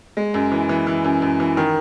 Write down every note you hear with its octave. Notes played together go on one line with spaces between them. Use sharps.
G#3
F#2
E3
E3
E3
F#2
F#2
E3
D#3